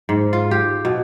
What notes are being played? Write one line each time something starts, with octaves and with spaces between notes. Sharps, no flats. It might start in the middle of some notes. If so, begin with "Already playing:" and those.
G#2
F4
G4
B2